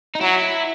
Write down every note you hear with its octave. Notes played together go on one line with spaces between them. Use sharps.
D#4
F#3 E4